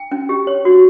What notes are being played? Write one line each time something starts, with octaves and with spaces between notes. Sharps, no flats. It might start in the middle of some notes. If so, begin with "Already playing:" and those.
Already playing: G5
C#4
G4
C#5
F#4